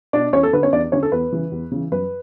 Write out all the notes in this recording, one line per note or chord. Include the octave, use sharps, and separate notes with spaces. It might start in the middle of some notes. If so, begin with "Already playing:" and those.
B2 D4 D5
E2 C#4 C#5
A4
D3 B4
C#4 C#5
E2 D4 D5
D3 C#4 C#5
A4
E2 B4
C#3 E3
E2
C#3 E3
F#2 B4